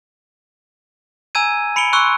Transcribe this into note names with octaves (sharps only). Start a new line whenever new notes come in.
G#5 A#5 E6 G6 G#6 D#7
B5 C#7 D7 F7 G7
C6 C#6 E6 F#6